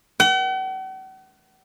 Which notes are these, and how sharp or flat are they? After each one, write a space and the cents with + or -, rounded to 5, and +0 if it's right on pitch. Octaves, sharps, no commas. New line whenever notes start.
F#5 +45